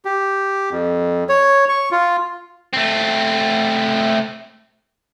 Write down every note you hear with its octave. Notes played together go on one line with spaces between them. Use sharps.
G4
F2
C#5
C#6
F4
A3 C4